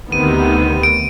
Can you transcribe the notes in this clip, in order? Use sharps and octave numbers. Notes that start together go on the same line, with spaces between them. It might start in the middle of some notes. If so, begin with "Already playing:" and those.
D2 C3 D#3 B3 D#7
D7